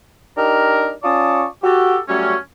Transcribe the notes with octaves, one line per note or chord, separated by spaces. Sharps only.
D4 D#4 G4 A#4
C#4 F4 D5 A5 C#6 D#6
F#4 G4 A4
F#3 G3 A3 C#4